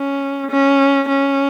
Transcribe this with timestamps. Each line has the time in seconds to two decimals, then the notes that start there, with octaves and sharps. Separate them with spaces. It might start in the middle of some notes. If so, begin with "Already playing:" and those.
Already playing: C#4
0.50 C#4
1.09 C#4